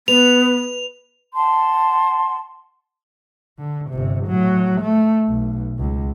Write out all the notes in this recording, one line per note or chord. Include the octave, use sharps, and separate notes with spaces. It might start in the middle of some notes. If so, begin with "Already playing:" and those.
B3 B4 F7
F#5 A5 C6
D3
G1 C3
A2 F#3
A3
B1
C#2